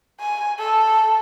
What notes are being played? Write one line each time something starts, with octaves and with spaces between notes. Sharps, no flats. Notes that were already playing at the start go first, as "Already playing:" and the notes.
G#5
A4